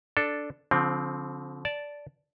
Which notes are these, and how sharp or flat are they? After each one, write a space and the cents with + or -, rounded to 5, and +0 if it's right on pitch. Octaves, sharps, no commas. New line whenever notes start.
D4 +0 A4 +0
D3 -35 F3 +15 C4 +0
D5 -10 A5 +0